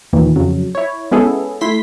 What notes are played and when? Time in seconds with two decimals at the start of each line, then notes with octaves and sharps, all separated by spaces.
0.13 D#2 A#2 D#3 E3
0.36 F2 C#3 F#3
0.75 E4 C#5
1.11 G#3 B3 C#4 E4 G#4 A4
1.61 A3 E4 C6 B6